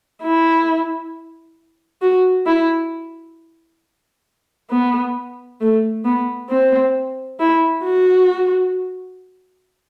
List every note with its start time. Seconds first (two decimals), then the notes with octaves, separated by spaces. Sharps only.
0.22 E4
2.02 F#4
2.46 E4
4.70 B3
5.61 A3
6.05 B3
6.49 C4
7.40 E4
7.84 F#4